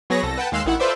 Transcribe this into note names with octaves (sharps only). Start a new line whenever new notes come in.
F#3 B3 G#4 B4 C#5 A#6
C2 A4 A#6
B4 F#5 G5 A5
D#2 G#3 F5 C6 E6 F#6
A1 D#3 E4 F#5
F4 A4 B4 C5 D5 E5